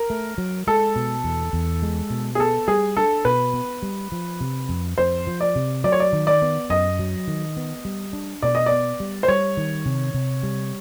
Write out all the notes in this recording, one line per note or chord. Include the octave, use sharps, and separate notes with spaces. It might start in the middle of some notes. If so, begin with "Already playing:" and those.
Already playing: A#4
A3
F#3
G#3 A4
B2
E2
E2
G#3
B2
G#4
B3 A4
G3 G#4
D4 A4
B2 B4
B3
G3
F3
C3
F2
F2 C5
F3
D5
C3
F#3 D5
C#5
D5
D#3
D5
B3
F#2 D#5
F#3
D#3
B3
G3
D4
B2 D5
D#5
D5
B3
G3
C5
G3 C#5
D#3
C3
C3
G3